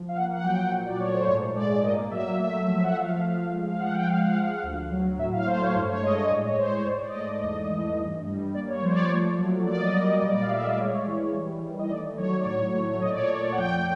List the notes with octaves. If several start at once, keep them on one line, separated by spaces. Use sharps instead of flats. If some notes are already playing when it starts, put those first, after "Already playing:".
Already playing: F3
F5
A#3 F#5
F#5
F#3 G5
A#2
D5
A3 C#5
C5
G#2 C#5
G#3 D5
A#3 D#5
F#3 E5
A3 E5
F3
F#5
A3 F5
F3
G#3
F5
F3 F#5
G5
G#3 F5
F#5
F5
F3
D2
F#3
A2 E5
F5
A3 C5
C#5
G2 C5
C#5
G#3 D#5
D#5
A2 D5
C#5
G#3 C5
C#5
G#2 D5
D5
D#5
A3 D5
D#5
E2 D#5
E3
G2
G3
A#3 D5
C#5
F3 C5
D5
C#5
A3
F#3
A#3 D5
D#5
D5
G3 D#5
D5
A#2 D#5
D5
F5
A3 E5
D#5
D5
G#3 C#5
E3
G3
D#3
D#5
A3 D5
F#3 C#5
D5
A2 C#5
A3
A#2 D#5
D5
C#5
A3 D5
F#5
F2 G5